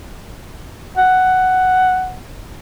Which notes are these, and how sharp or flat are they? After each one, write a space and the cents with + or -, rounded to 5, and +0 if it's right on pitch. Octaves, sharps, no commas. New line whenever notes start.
F#5 +5